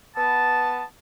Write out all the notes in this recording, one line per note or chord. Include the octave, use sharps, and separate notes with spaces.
B3 A5